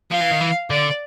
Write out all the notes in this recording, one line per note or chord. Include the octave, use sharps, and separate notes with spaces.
F3 F5
E3
D#3
E3
D3 D5